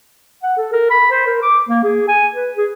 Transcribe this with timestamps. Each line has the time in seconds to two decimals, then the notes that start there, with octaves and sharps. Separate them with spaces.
0.43 F#5
0.57 A4
0.73 A#4
0.90 B5
1.12 C5
1.27 A#4
1.43 D6
1.69 A#3
1.84 G#4
2.08 G#5
2.34 B4
2.57 G#4